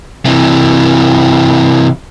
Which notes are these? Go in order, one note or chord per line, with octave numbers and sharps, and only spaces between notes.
C3 E3